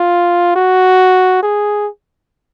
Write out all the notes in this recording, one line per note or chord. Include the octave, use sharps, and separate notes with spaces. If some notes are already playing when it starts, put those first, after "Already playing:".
Already playing: F4
F#4
G#4